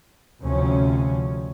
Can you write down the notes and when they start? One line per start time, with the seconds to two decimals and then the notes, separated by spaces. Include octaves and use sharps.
0.42 D2 C3 F3 C#4